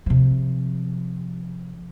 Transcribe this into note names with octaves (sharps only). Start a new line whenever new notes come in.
C3 F3